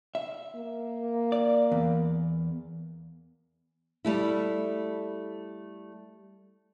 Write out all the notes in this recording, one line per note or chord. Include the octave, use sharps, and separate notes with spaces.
E5
A#3
D5
E2
G3 A3 E4